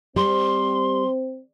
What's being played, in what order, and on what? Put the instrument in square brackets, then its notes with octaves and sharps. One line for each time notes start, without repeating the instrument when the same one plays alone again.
[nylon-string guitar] G3 [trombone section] C4 [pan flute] C6